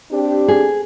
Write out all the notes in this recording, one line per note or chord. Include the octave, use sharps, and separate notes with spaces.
C4 D4 G4
G#4